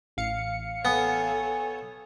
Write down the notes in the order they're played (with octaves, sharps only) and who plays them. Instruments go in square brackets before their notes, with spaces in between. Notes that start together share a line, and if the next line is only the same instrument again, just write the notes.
[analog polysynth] A1 F5 C#7
[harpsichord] B3 [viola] A4 C#5 [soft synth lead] G#5